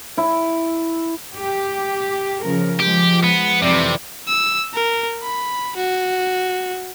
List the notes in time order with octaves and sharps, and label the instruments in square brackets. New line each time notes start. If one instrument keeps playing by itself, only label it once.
[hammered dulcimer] E4
[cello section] G4
C#3 F3 A#4
[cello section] F3 G#3 [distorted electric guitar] G4
[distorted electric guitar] B3
[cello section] F2 E3 D5 [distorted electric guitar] C3
[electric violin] E6
A#4
B5
F#4